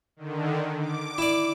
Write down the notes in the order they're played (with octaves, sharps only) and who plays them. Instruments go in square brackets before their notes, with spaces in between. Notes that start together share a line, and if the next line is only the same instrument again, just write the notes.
[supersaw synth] D3 D#3
D6
[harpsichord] E4 D5